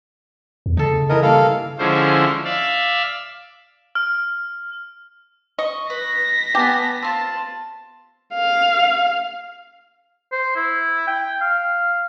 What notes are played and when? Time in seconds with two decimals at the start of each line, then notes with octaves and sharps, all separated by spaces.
0.66 E2
0.77 C#3 D#4 A4
1.09 D#3 E3 A#4 D#5
1.22 G2 A#3 A4 F5
1.79 D3 F3 G#3 C#4 E4 C5
2.45 D5 E5 F5 E6
3.95 F6
5.59 D#5 C#6
5.90 B4 A#6 B6
6.55 B3 G4 G#5 A5
7.02 C4 F4 A5
8.34 F5
10.32 C5
10.56 E4
11.07 G5
11.41 F5